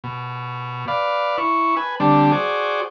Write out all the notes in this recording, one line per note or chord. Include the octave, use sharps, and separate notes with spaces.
B2
B4 D5 F5
E4 C#6
B4 G#5
D3 G3 C4 D4
F#4 G#4 C5 D5